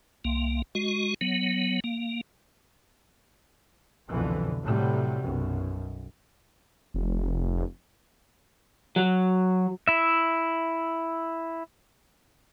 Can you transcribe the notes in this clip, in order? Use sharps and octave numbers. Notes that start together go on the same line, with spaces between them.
C2 A#3
G#3 F#4
F#3 B3
A#3
C2 F2 B2 D3 E3 F3
A2 C3 F#3 G3
B1 F#2
F1
F#3
E4 E5